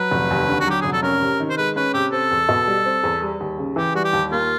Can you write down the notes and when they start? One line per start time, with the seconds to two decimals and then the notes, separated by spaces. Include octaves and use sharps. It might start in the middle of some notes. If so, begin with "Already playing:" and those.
Already playing: F#3 B4
0.11 F1
0.30 D#2
0.49 D3
0.60 F#4
0.67 F#3 G4
0.81 F1 G#4
0.93 A4
1.03 C#4 A#4
1.22 C3
1.40 D#3
1.49 C5
1.57 G#3 B4
1.76 C#4 B4
1.94 C3 G4
2.12 C4 A4
2.31 E2
2.49 B2
2.67 G3
2.86 C4
3.03 E2
3.22 G3
3.40 D#2
3.58 C#3
3.76 E3 G4
3.95 G3 F#4
4.05 G4
4.13 D#2
4.32 A#3 F4